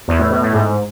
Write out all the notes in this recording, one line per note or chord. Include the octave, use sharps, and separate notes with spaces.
E2
A2
B2
A2
G#2